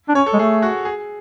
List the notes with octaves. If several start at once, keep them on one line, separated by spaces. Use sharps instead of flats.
D4
C#4 C#5
A4
G#3
A3 G#4
F#4
G#4